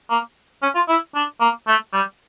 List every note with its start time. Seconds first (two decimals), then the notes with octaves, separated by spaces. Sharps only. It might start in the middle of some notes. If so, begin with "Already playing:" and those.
0.10 A#3
0.63 C#4
0.75 F4
0.88 E4
1.15 D4
1.41 A#3
1.67 A3
1.93 G3